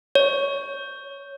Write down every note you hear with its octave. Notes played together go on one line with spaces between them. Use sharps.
C#5